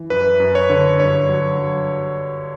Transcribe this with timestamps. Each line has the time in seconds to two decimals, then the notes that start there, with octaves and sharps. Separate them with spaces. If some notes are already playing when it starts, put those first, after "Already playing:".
Already playing: E3
0.10 F#2 B4
0.40 F#2
0.55 C#5
0.70 D3
1.00 G2 C#5
1.29 F#3
1.59 F#3